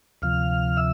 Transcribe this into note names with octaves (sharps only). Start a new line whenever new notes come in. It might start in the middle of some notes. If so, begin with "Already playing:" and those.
D2 C3 F3 F5 F6
E5 E6